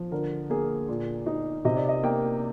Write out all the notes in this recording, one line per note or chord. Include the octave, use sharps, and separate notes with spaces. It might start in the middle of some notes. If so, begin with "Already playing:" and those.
Already playing: F3
D3 A#4
A#3 G#4
A#2
D#4
C3 D#5
D5
D#5
A#3 G5